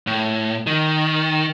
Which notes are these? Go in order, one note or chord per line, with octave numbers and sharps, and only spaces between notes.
A2
D#3